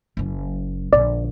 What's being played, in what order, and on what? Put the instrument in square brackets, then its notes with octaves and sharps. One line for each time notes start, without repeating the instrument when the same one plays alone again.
[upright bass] F#1 F#3
[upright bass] A#1 D3 [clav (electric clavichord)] D5